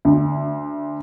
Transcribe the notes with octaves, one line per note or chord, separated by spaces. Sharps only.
D2